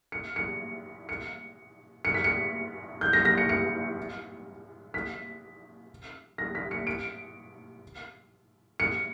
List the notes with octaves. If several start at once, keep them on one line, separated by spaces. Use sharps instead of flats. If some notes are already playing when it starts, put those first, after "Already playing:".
C#7
C#7
C#7
C#7
B6
C#7
G6
A#6
A#6
C#7
C#7
B6
A#6
B6
C#7
D7
C#7